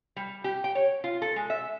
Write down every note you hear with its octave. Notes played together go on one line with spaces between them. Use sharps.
G3
G4
G5
C#5
F4
A4
G#3
E5